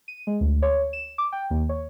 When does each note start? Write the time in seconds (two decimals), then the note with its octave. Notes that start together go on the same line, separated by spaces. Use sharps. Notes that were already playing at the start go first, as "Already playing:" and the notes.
0.08 D#7
0.27 G#3
0.41 D2
0.62 C#5
0.93 E7
1.18 D6
1.32 G5
1.50 D#2
1.69 C#5